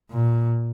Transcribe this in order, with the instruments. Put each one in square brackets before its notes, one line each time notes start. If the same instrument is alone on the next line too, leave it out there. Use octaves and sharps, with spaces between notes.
[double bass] A#2